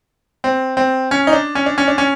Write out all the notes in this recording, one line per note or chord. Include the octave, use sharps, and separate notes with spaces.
C4
C4
C#4
D#4
D4
C#4
D4
C#4
D4
C#4